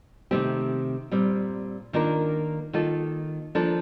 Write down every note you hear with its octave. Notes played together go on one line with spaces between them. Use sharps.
C3 D#3 A3 C4 G4
A#2 G3 C4
D#3 A#3 D4 F4 A#4
D#3 A#3 F4 A4
F3 A#3 D4 A4